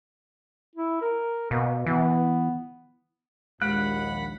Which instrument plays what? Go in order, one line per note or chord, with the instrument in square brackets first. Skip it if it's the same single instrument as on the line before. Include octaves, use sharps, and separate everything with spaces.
[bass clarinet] E4
A#4
[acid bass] B2 [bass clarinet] A#3
[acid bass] E3 [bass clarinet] B3
[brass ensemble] A#1 D#2 [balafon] G#3 [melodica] F#5 B5 [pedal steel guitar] F#6